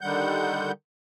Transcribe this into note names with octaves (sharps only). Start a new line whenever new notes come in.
D3 D#3 G3 F#5 G6